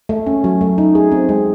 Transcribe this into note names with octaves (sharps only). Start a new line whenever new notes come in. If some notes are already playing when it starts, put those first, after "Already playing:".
A3
C#4
F#3
A3
D#4
G#4
C4
G#3